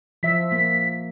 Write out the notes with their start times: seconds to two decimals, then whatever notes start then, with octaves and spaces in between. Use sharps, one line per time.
0.23 F3 E5 B6
0.52 A#3